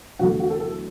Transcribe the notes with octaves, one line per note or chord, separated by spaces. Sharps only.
E2 D3 F#3 A3 F#4
F#4
A4
A4